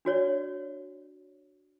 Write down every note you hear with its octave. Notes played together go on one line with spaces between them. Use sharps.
D4 F#4 C#5 D5